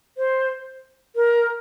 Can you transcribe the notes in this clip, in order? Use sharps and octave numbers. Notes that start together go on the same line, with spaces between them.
C5
A#4